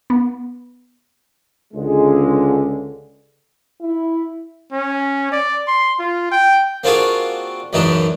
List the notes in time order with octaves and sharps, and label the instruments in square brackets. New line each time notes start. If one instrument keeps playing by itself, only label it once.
[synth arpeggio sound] B3
[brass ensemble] C#2 D3 G#3
[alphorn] E4
[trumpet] C#4
D5
C6
F4
G5
[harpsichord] A#3 C4 D4 F4 F#4 G#4
C#2 F#2 E3 D4 D#4